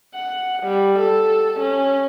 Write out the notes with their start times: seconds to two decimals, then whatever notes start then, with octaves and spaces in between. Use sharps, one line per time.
0.14 F#5
0.63 G3
0.99 A4
1.60 C#4